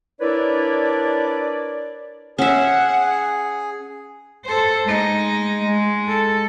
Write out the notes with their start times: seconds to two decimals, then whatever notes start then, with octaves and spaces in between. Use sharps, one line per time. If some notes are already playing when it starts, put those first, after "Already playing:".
0.20 D4 E4 A#4 B4 C#5 D5
2.38 C#4 G#4 E5 F#5
4.45 A4 C5
4.86 G#3 D#4
5.64 G#3
6.08 A4